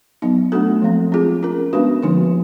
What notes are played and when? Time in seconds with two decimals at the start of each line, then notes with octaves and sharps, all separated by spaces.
0.22 F#3 B3 D#4
0.52 A3 D4 F#4 A4
0.82 F3 G#3 C4
1.12 C4 F4 G#4
1.43 C#4 F4 A#4
1.73 G#3 B3 D4 F#4 B4
2.03 D3 F3 A#3 D#4 F#4